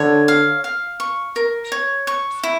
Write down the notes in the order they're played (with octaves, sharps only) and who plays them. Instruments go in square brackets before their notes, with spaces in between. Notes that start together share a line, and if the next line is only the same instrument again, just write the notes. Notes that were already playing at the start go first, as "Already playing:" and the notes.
Already playing: [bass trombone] D3 [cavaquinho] C#5
[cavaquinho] F5
F5
C#6
A#4
C#5
C#6
E4